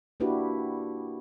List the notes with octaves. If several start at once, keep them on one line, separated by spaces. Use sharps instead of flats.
A#3 D4 E4 F#4 G4 B4